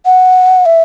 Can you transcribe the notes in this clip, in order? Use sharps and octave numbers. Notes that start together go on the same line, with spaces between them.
F#5
E5